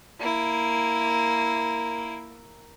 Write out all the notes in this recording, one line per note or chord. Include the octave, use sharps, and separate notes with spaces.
A#3 E4